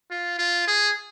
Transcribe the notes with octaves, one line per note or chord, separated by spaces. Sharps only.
F4
F4
G#4